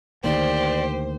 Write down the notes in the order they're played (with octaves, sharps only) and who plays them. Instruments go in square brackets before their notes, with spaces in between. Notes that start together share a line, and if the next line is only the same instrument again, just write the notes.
[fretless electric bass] D2 D#3 A#3 [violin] G4 [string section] C5 [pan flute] D5